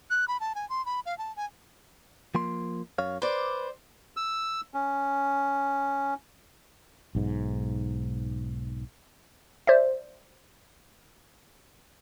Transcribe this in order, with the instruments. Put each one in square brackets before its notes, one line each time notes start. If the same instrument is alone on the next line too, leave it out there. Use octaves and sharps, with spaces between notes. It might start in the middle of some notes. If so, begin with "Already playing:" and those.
[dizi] F#6
B5
A5
G#5
C6
B5
F5
A5
G#5
[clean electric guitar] F3 A#3 C6
F#2 C#5 F5
[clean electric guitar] B4 [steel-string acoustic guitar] C5 D5
[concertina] E6
C#4
[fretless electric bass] B1 G#2
[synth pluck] C5 D5 E5